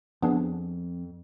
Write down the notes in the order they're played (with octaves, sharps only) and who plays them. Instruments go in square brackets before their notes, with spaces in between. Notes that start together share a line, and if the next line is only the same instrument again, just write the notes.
[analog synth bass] F2 [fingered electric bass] F3 C4 [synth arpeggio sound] B3 D4 G#4